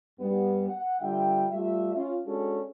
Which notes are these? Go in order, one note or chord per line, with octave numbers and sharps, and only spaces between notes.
G2 G3 B3
F#5
D3 G3 F4 E5 G5
G3 A3 F4 E5
C#4 F4
G#3 C#4 D4 F#4 G#4 A4